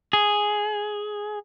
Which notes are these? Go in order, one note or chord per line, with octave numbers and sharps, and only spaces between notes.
G#4